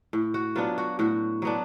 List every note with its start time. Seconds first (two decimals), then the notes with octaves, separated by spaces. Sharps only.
0.13 A2
0.34 F#4
0.55 F#3 B3 D4 F4
0.78 F#4
0.99 A2 F#4
1.42 F#3 B3 D4